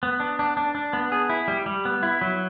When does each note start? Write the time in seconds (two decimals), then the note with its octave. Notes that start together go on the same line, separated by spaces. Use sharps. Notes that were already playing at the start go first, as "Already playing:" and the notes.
0.03 B3
0.20 D4
0.39 D4
0.57 D4
0.75 D4
0.93 B3
1.12 G#4
1.29 E4
1.48 G3
1.66 G3
1.85 B3
2.03 E4
2.21 F#3